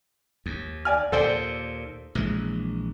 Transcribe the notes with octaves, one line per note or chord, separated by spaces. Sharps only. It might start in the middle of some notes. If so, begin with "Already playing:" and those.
D#2
D5 G#5 F6
D#2 A#2 A4 C5 D5
A#1 E3 G#3